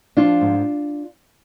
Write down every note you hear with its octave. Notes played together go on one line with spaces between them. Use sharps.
F3 D4 F4
G#2